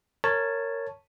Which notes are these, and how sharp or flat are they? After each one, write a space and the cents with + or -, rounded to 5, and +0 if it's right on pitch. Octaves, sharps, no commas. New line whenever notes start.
A#4 -20 C#5 +0 A5 +0